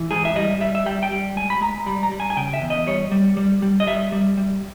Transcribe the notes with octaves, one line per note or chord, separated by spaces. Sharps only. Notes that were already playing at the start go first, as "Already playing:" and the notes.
Already playing: E3
G#2 G#4
E5
G3 D#5
G3 E5
E5
G3 G5
G5
G3
G#3 G#5
B5
G#3 A#5
G3 B5
A#5
G3
G#5
G#5
C#3 G5
E5
E2
D#5
G3 C#5
G3
G3
G3
D#5
G3 E5
G3
G3